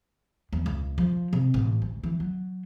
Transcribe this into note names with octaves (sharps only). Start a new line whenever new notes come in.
E2
C#2
F3
C3
A1
D2
E3
F#3